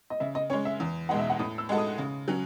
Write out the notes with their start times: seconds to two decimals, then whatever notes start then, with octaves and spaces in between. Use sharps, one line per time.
0.10 D#5
0.20 C#3 E5
0.35 D#5
0.50 C#4 C#5
0.53 G#3
0.65 E5
0.80 E2
1.09 B2 G#3 D#4 F#5
1.19 E5
1.30 F#5
1.39 A2 D#6
1.58 E6
1.69 G#3 D#4 F#4 A4
1.78 D#6
1.98 C#3
2.28 F#3 C#4